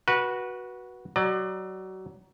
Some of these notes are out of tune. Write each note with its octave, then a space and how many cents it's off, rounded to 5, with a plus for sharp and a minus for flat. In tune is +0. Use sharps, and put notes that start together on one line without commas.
F#4 +0 B4 -20
F#3 +25 D5 +35